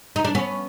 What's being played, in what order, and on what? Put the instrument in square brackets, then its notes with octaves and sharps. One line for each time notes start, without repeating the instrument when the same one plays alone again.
[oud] D#4
D4
B3 C#4